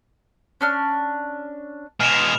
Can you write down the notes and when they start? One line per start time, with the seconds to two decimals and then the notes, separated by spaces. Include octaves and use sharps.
0.61 C#4 D4 F6
2.00 B2 G#3 F6 E7 F7